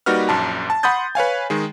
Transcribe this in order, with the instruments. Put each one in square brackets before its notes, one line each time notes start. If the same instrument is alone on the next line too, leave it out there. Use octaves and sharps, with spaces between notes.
[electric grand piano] G3 A#3 D#4 F#4 B4 F6
A#1 F#2 A5
A5
F#5 B5 C6 D#6 G6 A6
B4 C#5 F5 G#5
D#3 G#3